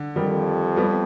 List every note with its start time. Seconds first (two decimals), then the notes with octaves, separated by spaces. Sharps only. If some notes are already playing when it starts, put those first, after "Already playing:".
Already playing: D3
0.16 F2 D#3 G3
0.77 G3 B3